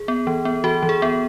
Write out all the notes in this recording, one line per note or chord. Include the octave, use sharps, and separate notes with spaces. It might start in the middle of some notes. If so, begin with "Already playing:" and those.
Already playing: G#4
B3
E3
B3
E3 F#4
E3
G#4
B3